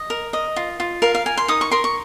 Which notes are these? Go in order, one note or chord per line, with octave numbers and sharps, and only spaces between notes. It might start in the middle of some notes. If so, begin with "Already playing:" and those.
Already playing: D#5
A#4
D#5
F4
F4
A#4 F5
F5
A#4 G#5
C6
D#4 D#6
C#6
A#4 C6
C#6